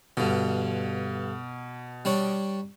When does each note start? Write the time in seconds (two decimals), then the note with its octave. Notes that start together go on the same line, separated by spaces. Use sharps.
0.17 G2 B2 D3
2.05 G3 D4 C#5